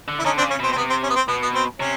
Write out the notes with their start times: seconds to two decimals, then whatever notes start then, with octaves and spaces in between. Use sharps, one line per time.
0.08 D3
0.19 E4
0.25 D3 C#4 D#4
0.37 C4 D4
0.42 C#3
0.50 C#4
0.60 B2 C4
0.72 C4
0.76 C3 B3
0.90 C4
1.03 C#4
1.10 B3
1.16 C4
1.28 B2 B3
1.42 B3
1.55 C4
1.80 C3 C#4